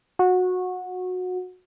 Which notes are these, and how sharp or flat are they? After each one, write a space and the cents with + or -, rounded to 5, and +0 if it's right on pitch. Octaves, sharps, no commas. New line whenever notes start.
F#4 -20